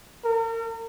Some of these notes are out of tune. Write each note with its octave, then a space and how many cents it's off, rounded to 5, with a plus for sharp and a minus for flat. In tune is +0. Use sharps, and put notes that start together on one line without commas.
A#4 -40